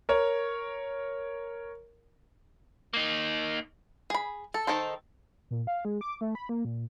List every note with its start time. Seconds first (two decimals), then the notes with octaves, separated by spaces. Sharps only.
0.09 A#4 C#5
2.93 A#3 D#4
4.10 G#4 B5
4.54 A4
4.67 D#3 D#4 A4 C5
5.51 A#2
5.67 F5
5.85 G#3
6.01 D6
6.21 A3
6.35 B5
6.49 A#3
6.65 A#2